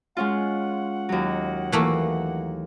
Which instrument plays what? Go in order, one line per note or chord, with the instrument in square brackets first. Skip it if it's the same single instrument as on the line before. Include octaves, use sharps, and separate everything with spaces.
[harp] G#3 C#4 F4 [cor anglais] F#5
[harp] D#2 F#3
[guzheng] E3 A3 A#3